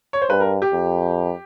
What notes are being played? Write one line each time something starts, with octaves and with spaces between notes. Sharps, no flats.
C#5
C5
G2 B4
A#4
G4
F2